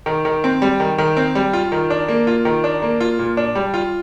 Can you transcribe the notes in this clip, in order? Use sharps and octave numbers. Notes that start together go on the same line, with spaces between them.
D#3
D#3
C4
G3
D#3
D#3
C4
G3
F4
D#3
D4
A#3
F4
D#3
D4
A#3
F4
A#2
D4
G3
F4